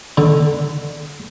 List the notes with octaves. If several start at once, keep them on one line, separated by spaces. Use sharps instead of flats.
D3